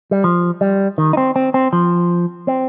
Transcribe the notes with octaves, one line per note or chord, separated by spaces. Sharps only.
G3
F3
G3
D#3
D#4
C4
C4
C4
F3
C4